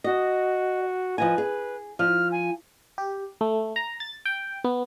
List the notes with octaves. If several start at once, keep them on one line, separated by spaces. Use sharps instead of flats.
F#4 D#5
F3 B4 D#5 G#5
G#4
F3 F6
G#5
G4
A3
A#5
A6
G5
B3